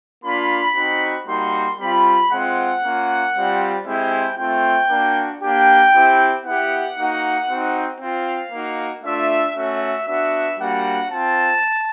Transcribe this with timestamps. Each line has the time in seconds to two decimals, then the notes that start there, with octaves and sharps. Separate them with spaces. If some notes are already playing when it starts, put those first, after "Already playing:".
0.24 A#3 D4 F4 B5
0.76 C4 D#4 F#4
1.28 G3 A#3 D#4 F#4 C6
1.79 G3 C4 F4 B5
2.32 G#3 C4 F4 F#5
2.83 A#3 C#4 F4
3.36 G3 C4 F4
3.87 G#3 C4 E4 G4 G5
4.38 A3 C4 F4 G5
4.90 A#3 D4 F#4
5.42 A#3 D4 G4 G5
5.93 C4 E4 G4
6.46 B3 E4 G4 F#5
6.98 A#3 D#4 F#4
7.49 C4 D#4 F#4
8.01 C4 F4 F5
8.52 A#3 D#4 F#4
9.04 A3 D4 F4 E5
9.57 A3 C#4 F#4 E5
10.08 B3 D4 F#4 E5
10.60 G3 A#3 D4 F#4 F#5
11.11 C4 F4 A5